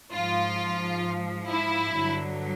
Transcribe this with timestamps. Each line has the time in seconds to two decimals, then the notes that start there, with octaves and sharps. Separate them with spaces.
0.12 G#2 F3 F4
1.49 E4
1.95 G2 D3 F#3